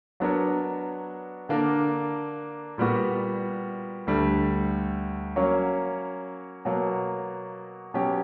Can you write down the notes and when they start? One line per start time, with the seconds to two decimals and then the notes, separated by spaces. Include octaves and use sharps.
0.20 F#3 B3 D4 A#4 C#5
1.49 D3 A#3 D4 A#4
2.78 A#2 G3 B3 F#4
4.07 D2 D3 G3
5.36 F#3 A#3 C#4
6.65 B2 F#3 A#3
7.94 B2 F#3 C#4 G4